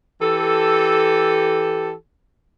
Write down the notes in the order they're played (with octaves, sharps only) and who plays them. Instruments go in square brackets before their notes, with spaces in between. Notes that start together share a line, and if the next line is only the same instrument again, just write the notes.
[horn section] E3 G4 A4